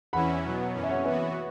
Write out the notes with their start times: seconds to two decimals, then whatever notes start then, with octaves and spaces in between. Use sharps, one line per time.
0.13 E2 E3 C#4 E4 F#5 B5
0.44 B2 F#3 B3
0.74 F#2 E3 C#4
0.83 E5
0.89 C#5 F#5
1.04 E3 B3 F#4 B4 E5